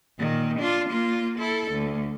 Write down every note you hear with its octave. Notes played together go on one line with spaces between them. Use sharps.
A#2 D#3
D4 F4
A#3 F4
E4 A4
D2